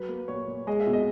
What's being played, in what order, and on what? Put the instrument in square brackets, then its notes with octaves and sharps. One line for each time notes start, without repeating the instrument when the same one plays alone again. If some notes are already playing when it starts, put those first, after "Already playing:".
Already playing: [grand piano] F#3 B4
A#3
A#2 C#5
A#2
G#3 D#5
E5
B2
D#5